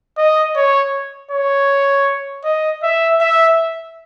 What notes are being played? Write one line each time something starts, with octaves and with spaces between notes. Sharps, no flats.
D#5
C#5
C#5
D#5
E5
E5